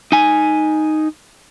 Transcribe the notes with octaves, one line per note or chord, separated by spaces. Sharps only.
D#4 G#5